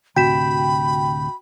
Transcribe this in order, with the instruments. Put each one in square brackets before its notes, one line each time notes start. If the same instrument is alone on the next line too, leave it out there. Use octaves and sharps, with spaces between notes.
[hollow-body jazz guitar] D2 A2 C3 [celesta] F#4 B6 E7 [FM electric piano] G5 [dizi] B5